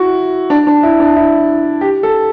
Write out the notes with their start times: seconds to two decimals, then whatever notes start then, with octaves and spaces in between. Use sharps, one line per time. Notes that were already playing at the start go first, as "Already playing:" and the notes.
Already playing: E4 F#4
0.50 D4
0.67 D4
0.83 E4
1.00 D4
1.16 E4
1.81 G4
2.03 A4